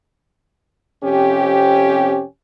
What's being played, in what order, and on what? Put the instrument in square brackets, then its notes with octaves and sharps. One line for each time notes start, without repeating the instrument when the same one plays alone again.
[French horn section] F2 C3 C#4 G4